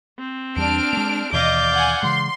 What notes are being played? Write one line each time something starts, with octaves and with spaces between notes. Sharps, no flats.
C4
E2 G3 D4 F6 D7
G#3 A#3
D#2 B2 E3 D5 D#5 F5 D6 G6
F#5 G#5
C#3 E3 G#3 C6